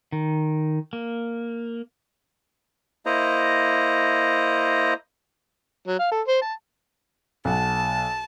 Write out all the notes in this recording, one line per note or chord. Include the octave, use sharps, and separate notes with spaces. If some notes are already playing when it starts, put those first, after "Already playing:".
D#3
A#3
A#3 E4 C5 D#5 A#5
F#3
F5
A4
C5
A5
B1 F#5 A5